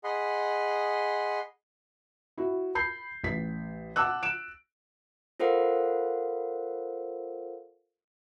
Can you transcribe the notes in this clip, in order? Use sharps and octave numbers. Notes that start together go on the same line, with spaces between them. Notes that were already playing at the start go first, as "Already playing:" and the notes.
G#4 D#5 F#5 B5 C6
E4 F#4
B5 G6 C7
A1 B6
F#5 A5 D6 E6 F#6
D7 E7
F4 A4 A#4 C5 F5 F#5